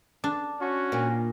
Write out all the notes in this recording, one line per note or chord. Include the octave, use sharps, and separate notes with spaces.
D4
C#4 F#4
A#2